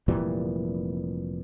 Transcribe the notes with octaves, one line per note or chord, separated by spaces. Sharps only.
F1 A#2 E3 G3